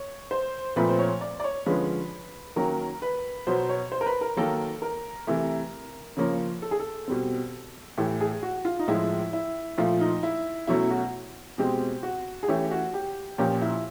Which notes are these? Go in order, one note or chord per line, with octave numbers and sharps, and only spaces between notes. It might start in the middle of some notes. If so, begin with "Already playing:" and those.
Already playing: C#5
C5
A#2 F3 A3 C4 B4
C5
C#5
D5
D5
C#5
D3 F3 G#3 C#4 B4
D#3 F#3 A#3 C#4 A#4
B4
B2 F#3 B3 C5
C#5
C5
A#4
B4
A#4
D#3 F#3 A#3 A4
A#4
C3 E3 A3
C#3 F3 A#3 C#4
A4
G#4
A4
B2 G3 C4
A2 E3 A3 G4
G#4
F#4
F4
D#4
A2 F3 G#3 E4
E4
A#2 F3 A3 F4
D#4
E4
B2 F#3 A3 C#4 E4
F#4
B2 G#3 C4 G4
F#4
G#4
E3 A3 C#4 G4
F#4
G4
A#2 F3 A#3 C#4 G4
E4